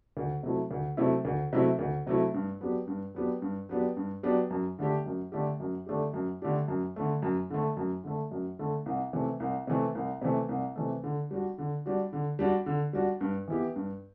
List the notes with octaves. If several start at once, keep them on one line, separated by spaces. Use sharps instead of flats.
D2
C3 F#3 A3 E4
D2
C3 F#3 A3 E4
D2
C3 F#3 A3 E4
D2
C3 F#3 A3 E4
G2
F#3 B3 D4 G4
G2
F#3 B3 D4 G4
G2
F#3 B3 D4 G4
G2
F#3 B3 D4 G4
F#2
D3 A3 D4 G4
F#2
D3 A3 D4 G4
F#2
D3 A3 D4 G4
F#2
D3 A3 D4 G4
F#2
D3 A3
F#2
D3 A3
F#2
D3 A3
F#2
D3 A3
C2
C3 E3 A3
C2
C3 E3 A3
C2
C3 E3 A3
C2
C3 E3 A3
D3
G3 D4 F#4
D3
G3 D4 F#4
D3
G3 D4 F#4
D3
G3 D4 F#4
G2
E3 B3 E4 G4
G2